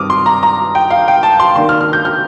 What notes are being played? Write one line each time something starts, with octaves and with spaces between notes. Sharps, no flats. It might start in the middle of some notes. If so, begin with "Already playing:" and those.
Already playing: G2 D#3 G3 C4 D6 D#6 F6
C6
A#5
A#5
G5
F5
G5
A5
C6
D#2 D#3 A#3 D4 C6
F6
F6
G6
F6